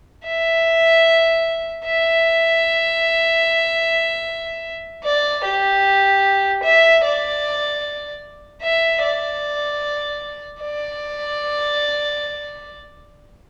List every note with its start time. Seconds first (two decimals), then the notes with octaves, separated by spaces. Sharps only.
0.26 E5
1.86 E5
5.04 D5
5.44 G4
6.63 E5
7.04 D5
8.63 E5
9.02 D5
10.62 D5